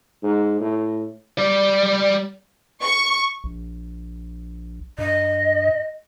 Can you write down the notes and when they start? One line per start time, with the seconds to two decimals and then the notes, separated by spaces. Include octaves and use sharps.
0.23 G#2
0.60 A2
1.38 G3 D5
2.83 C#6
3.44 A#1
4.98 G2 D#5